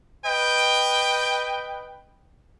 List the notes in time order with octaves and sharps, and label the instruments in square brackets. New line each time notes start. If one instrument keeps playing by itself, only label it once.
[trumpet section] B4 D#5 G5